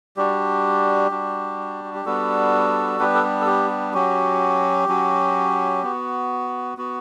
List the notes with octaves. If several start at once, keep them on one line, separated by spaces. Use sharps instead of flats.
G3 D4 F#4 G4
G3 D4 F#4
F#4
G4
G3 B3 D4 F#4 A4
G3 B3 D4 G4 B4
A4
G4
A4
G4
G4
F#3 C#4 F#4 G4
F#3 C#4 F#4
B3 F#4
B3 F#4